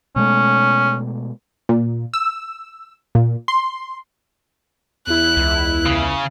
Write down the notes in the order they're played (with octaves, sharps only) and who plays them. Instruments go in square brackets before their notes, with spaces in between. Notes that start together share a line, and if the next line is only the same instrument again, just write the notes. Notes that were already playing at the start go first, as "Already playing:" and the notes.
[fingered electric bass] B2 G#3 A3 [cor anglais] C#4
[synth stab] A#2
E6
A#2
C6
[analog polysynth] E2 E4 [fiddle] F#6
[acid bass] C#2
[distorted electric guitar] C#3